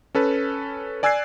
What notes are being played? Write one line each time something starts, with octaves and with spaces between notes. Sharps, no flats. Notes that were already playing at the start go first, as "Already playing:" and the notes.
C#4 A4 B4
D5 G#5 E6 F#6 G#6 C7